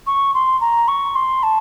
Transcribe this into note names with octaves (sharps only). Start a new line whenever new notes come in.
C#6
C6
A#5
C#6
C6
A5